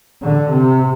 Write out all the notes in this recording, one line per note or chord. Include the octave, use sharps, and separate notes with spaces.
D3
C3